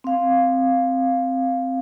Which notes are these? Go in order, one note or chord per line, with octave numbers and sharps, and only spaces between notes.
C4 F5